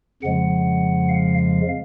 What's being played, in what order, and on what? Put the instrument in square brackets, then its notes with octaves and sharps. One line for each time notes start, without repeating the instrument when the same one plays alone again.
[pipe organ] F2 C#3 F3 G#3 F#5
F5
F5